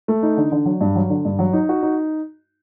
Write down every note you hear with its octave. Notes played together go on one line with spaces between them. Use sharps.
A3
D#4
D3
D3
F#3
G2
F#3
D3
G2
F#3
D#4
F#4
D#4